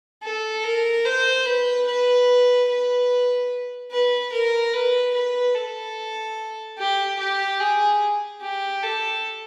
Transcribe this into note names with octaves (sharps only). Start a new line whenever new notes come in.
A4
A#4
C5
B4
B4
B4
B4
A#4
B4
B4
A4
G4
G4
G#4
G4
A4